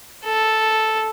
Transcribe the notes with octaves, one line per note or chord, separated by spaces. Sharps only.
A4